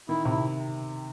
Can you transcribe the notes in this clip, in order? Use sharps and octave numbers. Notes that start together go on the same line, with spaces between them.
D#3 E4
C3 E4